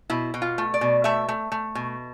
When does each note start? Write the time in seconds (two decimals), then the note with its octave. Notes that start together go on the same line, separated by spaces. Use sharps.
0.10 B2 E4
0.34 B2
0.42 F4
0.58 A3
0.74 D5
0.81 B2
1.04 A3 E5
1.29 A3
1.52 A3
1.75 B2